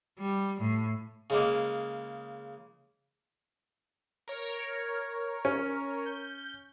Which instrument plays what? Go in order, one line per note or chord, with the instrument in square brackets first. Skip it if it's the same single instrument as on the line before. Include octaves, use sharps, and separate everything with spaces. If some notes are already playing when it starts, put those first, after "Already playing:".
[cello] G3
A2
[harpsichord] C#3 G#3 A#3
[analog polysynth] A#4 C#5
[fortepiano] C#4
[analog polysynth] G6